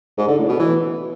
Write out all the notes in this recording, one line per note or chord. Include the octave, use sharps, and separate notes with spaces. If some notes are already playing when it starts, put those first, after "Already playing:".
G#2
D3
A2
B2
E3